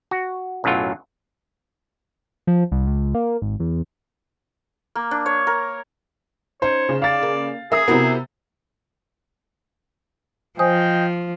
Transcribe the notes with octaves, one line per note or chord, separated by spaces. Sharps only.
F#4
B1 F#2 A2 F#3 F4
F3
C2
C#2
A#3
G#1
E2
A#3
D4
C#5
A#4
C#4 D#4 C5 C#5
C#3
D5 F5 A6
A#3
G#4 A#4 E5 A#5 D#6
C3 B3 E4 F#4 A#4
F3 C5 D#5 G5 G#5 D#6